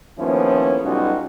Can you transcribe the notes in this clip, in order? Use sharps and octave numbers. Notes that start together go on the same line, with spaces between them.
D#2 F3 A3 B3 C#4 E4
B1 G3 C#4 D#4 F4 F#4